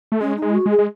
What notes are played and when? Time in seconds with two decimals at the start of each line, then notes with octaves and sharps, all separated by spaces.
0.12 A3
0.21 G#3 C#4
0.37 D#4
0.42 G#3
0.49 E4
0.54 F#4
0.66 G#3
0.70 G#4
0.79 G#3